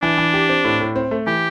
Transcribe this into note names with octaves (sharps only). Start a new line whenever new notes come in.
E3 D4
E3
G4
C4
A2
A2
C4
A3
E3 G4